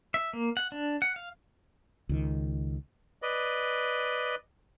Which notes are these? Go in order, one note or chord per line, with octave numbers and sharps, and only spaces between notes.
E5
A#3
F#5
D4
F#5
F5
C#2 D#3
B4 D5 D#5